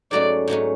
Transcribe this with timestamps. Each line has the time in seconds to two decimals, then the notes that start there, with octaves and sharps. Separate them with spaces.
0.11 G#2 F#3 A3 C#4 D5
0.48 G#2 F#3 A3 C#4